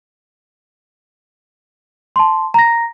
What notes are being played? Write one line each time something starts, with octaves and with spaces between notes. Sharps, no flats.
A5 C6
A#5 A#6